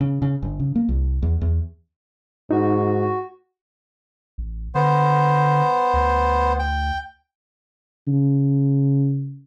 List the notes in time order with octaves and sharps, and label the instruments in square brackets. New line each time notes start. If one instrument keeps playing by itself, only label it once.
[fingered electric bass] C#3
C#3
G1
C#3
A#3
C2
E2
E2
[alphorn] G#2 [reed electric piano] D#4 [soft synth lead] F#4
[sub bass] A1
[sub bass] D3 [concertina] B3 C5
[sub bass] D2
[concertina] G5
[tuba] C#3